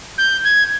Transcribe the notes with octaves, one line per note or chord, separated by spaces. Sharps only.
G6
G#6